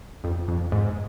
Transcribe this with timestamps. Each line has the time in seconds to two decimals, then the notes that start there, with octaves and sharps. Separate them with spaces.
0.24 F2
0.48 F2
0.72 G#2